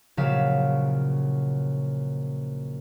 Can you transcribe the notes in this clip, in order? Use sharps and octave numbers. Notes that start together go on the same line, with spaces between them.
A#1 C#3 F#3 F5 B6 E7